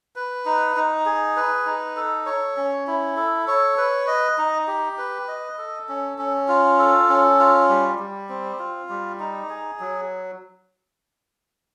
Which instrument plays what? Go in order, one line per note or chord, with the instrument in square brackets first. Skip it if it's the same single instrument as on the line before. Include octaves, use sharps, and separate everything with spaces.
[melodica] B4
D#4
D#4
G#4
B4
D#4
A4
C#5
C#4
E4
A4
C#5
B4
D#5
D#4
G4
B4
D#5
A4
C#4
C#4
F4
A4
C#4
F4
G3
G3
C4
F4
G3
D#4
G#4
F#3